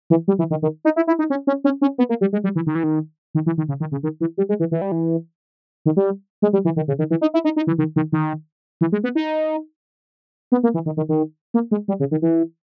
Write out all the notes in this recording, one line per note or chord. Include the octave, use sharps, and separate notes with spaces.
E3
G3
E3
D#3
D#3
D#4
E4
E4
D#4
C#4
C#4
C#4
C#4
B3
A#3
G3
G#3
G3
E3
D#3
E3
D#3
D#3
E3
D#3
C#3
D#3
C#3
D#3
E3
G3
G#3
E3
E3
G3
E3
D#3
G3
G#3
G3
E3
D#3
C#3
D#3
E3
D#4
E4
D#4
D#4
E3
D#3
D#3
D#3
E3
G#3
B3
D#4
B3
A#3
E3
D#3
D#3
D#3
A#3
G#3
G3
C#3
D#3
E3